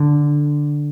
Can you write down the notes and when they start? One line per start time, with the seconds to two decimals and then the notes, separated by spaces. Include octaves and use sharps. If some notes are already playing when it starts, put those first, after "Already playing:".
Already playing: D3